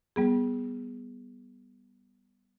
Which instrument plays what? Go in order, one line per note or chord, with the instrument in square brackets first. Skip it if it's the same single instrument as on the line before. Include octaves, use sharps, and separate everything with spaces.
[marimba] G3 B3 G#4